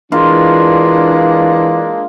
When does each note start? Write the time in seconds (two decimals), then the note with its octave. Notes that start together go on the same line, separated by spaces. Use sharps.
0.12 E3 G#3 A#3 D4 F4